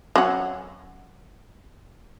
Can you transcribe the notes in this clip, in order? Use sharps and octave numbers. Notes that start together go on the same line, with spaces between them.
F#3 C#4 F#5